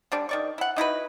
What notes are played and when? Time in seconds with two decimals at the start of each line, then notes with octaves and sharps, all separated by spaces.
0.12 D3 G3 D4
0.29 D#3 D5 C#6
0.58 E4 F#5
0.76 D#4 E4 F#4 B4